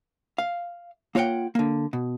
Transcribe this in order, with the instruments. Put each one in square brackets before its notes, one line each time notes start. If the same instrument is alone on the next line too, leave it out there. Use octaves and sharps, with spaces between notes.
[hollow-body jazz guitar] F5
A#3 F4 C#5 D#5 F#5 G5
D3 A#3
B2